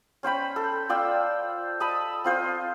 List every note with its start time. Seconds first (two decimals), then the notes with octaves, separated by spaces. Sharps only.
0.23 C#4 C5 G5 B5
0.56 A4
0.89 F4 D5 G5 E6
1.80 D#5 A5 B5 E6
2.24 C4 F4 C5 D#5